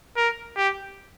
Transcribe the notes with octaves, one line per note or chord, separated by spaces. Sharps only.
A#4
G4